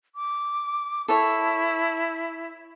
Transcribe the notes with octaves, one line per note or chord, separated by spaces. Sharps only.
D6
E4 A4 C#5